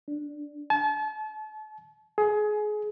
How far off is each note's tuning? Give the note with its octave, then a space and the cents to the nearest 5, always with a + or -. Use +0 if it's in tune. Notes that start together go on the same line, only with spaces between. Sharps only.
D4 +0
A5 -35
G#4 +25